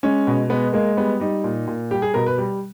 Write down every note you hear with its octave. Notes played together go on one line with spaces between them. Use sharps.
G#3 C#4
B2
G#3 B3
G#3 A#3
G3 B3
G3 D#4
A#2
A#2
G3 G4
G#4
B2 A#4
B4
G3